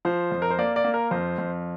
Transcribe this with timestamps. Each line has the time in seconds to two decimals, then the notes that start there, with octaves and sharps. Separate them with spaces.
0.05 F3 C5
0.32 F2
0.42 A#4
0.50 C5
0.58 A#3 D5
0.76 D5
0.84 A#3
0.94 A#4
1.11 F2 C5
1.38 F2